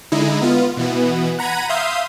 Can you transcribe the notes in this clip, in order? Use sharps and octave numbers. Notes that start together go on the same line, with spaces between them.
D3 G#3 D#4 E4
B3 F4
B2 E3 B3
F#5 A#5 B5 G#6 D#7
E5 F5 C6 D#6 G6